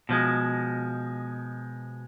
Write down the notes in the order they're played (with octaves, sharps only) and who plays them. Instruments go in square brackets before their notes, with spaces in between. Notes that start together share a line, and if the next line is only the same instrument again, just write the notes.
[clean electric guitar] B2 F3 G#3